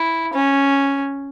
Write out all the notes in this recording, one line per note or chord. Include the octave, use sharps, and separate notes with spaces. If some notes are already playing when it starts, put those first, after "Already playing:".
Already playing: E4
C#4